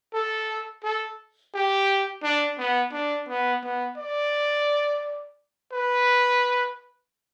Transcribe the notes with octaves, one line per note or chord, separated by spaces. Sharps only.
A4
A4
G4
D4
B3
D4
B3
B3
D5
B4